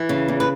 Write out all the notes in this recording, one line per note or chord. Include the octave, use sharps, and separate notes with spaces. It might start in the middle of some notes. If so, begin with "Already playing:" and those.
Already playing: E3
C#3
E2
B4